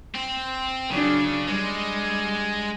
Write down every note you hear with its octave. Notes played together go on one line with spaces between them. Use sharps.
C4
C#3 F#3 D4
G3 G#3